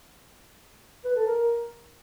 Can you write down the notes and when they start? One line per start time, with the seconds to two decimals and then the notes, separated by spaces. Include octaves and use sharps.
1.05 B4
1.16 A4
1.27 A#4